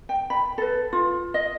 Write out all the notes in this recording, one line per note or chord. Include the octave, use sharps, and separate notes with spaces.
G5
B5
A4 B4
F4
D#5